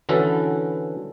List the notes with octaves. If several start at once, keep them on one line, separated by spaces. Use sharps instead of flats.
D3 E3 C#4 F#4 A4 B4